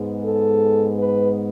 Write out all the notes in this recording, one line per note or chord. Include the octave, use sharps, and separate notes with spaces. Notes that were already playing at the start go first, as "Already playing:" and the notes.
Already playing: G#2 G#3 B3
A4
B4